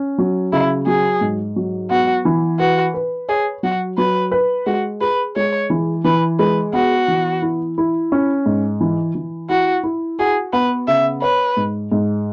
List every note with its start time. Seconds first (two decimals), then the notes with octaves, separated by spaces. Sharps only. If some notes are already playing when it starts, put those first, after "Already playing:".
Already playing: C#4
0.18 F#3
0.53 C#3 E4
0.87 F#3 G#4
1.21 G#2
1.56 F#3
1.90 B3 F#4
2.25 E3
2.60 F#4 B4
2.94 B4
3.29 G#4 C#5
3.63 F#3 F#4
3.98 F#3 B4
4.32 B4
4.66 G#3 F#4
5.01 G#4 B4
5.36 G#3 C#5
5.70 E3
6.05 E3 B4
6.39 G#3 B4
6.73 B3 F#4
7.08 E3
7.42 E4
7.78 E4
8.12 C#4
8.46 G#2
8.81 E3
9.15 E3
9.50 E4 F#4
9.84 E4
10.19 F#4 G#4
10.53 B3 B4
10.88 C#3 E5
11.22 B4 C#5
11.57 G#2
11.92 G#2